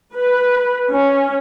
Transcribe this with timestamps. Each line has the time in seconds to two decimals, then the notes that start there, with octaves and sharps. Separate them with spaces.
0.15 B4
0.90 C#4